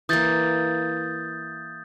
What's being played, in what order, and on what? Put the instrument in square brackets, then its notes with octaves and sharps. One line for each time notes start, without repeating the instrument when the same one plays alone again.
[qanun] E3 A#3 [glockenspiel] D#6 G6 A6